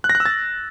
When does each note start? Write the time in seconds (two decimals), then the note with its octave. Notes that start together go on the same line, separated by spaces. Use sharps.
0.04 F#6
0.10 A#6
0.15 F#6
0.20 E6
0.26 A6